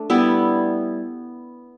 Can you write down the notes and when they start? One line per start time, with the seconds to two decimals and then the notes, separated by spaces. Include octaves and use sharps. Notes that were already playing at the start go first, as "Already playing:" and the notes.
Already playing: A3 D4
0.10 G3 B3 E4